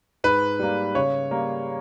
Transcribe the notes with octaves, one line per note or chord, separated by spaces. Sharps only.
G#2 B4
G3 A#3
C#3 C#5
G3 A#3